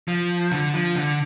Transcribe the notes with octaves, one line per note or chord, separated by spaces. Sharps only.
F3
D3
F3
D3